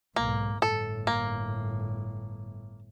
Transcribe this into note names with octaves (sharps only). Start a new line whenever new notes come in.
B1 G#2 A#3
G1 A2 A4
A#3